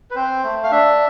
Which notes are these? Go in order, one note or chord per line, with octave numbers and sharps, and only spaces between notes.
B4
C4 C5
A3
F5
D4 E5